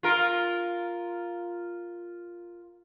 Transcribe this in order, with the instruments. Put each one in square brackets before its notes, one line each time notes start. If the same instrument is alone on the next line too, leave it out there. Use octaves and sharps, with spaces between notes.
[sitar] F4 A#4